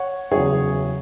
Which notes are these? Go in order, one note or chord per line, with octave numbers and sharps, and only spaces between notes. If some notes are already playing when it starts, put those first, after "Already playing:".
Already playing: C#5 F#5
E2 C#3 F#3 G#4 C#5